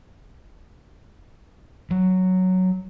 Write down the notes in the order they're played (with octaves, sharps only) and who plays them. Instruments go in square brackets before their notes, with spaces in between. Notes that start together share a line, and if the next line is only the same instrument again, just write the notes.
[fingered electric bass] F#3